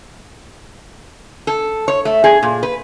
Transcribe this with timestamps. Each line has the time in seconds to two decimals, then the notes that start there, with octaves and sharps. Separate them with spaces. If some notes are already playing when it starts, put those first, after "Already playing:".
1.47 A4
1.88 C#5
2.05 A3
2.24 G#4
2.43 A#2
2.63 B4